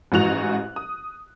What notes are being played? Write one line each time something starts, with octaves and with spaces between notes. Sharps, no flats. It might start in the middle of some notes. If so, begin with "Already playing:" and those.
A1 G#2 E3 F#4 F#6 F7
D#6